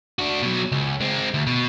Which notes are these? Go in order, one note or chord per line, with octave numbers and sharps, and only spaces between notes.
D4 F#4
B2 F#3
C#2
G#3 C4
D2
B2